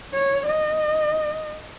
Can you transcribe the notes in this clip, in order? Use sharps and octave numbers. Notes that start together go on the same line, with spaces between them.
C#5
D#5